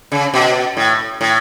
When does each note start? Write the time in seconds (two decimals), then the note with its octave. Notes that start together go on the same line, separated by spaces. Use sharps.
0.12 C#3
0.34 B2
0.77 A2
1.21 A2